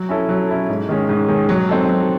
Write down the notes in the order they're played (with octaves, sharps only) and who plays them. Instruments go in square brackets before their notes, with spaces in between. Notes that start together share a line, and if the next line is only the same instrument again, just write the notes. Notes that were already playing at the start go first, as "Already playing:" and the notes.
Already playing: [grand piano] F#3
C#4 E4 A4
F#3
C#4 E4 A4
G#2
D#3 G#3 C#4
G#2
D#3 G#3 C#4
F#3
C4 D#4 A4
F#3